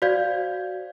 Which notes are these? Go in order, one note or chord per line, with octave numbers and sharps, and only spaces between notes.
F#4 C5 D5 F5 G6 G#6